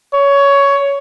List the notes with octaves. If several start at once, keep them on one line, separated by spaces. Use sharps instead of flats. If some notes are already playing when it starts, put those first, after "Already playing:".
C#5